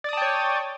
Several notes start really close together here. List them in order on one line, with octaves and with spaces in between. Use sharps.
D5 D#6 A5 G5 C#5